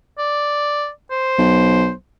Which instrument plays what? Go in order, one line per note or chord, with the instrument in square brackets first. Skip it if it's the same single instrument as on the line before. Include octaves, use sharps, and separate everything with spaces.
[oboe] D5
C5
[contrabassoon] B1